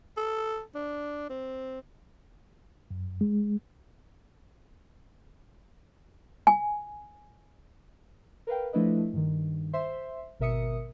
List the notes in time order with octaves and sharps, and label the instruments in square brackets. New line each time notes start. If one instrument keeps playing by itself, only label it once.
[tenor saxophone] A4
D4
C4
[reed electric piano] F#2
G#3
[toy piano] G#5
[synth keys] A#4 B4 F5 G5
F3 A3 D4 E4 B4 D#5
G2 D#3
C5 E5 C6
G#1 B2 A#4 E5 D#6 C#7